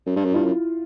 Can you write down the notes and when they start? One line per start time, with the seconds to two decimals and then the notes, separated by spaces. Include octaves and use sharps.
0.07 F#2
0.16 G2
0.25 F#2
0.31 E4
0.35 G2 F4
0.45 F#2